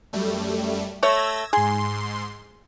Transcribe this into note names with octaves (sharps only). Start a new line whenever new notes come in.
F#2 G3 A3
A3 C#5 E6 G#6 A#6
G#2 G#4 C6